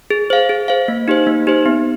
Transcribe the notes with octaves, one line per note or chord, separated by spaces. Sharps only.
G#4
C5 F5
G#4
C5 F5
A#3
D#4 G4 C5
A#3
D#4 G4 C5
B3